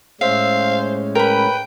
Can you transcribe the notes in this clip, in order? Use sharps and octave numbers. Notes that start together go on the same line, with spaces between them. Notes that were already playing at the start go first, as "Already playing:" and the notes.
A2 G#3 C#4 C5 E5 F5
A#4 B4 G5 B5